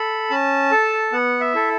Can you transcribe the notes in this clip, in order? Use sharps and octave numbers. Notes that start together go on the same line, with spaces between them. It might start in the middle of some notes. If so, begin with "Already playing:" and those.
Already playing: A4 B5
C#4 A5
A4
B3 F#5
E5
E4 A4